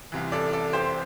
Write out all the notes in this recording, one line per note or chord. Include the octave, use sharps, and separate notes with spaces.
C2 C3 E3
A4 D5
A4 D5
G4 C5